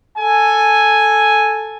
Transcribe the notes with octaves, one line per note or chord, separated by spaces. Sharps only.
A4 G#5